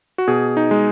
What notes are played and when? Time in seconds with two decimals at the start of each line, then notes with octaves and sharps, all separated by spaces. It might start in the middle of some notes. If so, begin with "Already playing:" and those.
0.18 F#4
0.28 B2 G#4
0.57 D#4
0.71 G#3